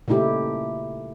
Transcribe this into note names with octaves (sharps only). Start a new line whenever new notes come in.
A#2 C#3 A3 D#4 E4 G4